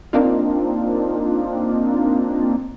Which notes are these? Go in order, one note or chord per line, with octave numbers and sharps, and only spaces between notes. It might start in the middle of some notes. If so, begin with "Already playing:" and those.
A#3 C4 D4 D#4 F4